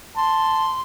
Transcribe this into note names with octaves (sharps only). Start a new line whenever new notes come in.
A5 C6